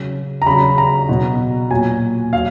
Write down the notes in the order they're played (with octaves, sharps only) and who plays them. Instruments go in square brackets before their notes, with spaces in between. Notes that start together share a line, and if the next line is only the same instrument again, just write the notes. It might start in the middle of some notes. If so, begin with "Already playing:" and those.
Already playing: [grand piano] C#3 F#3
A#5
C#3 F#3 B5
A#5
B2 F#3
A#2 F#3 G#5
F#3 F5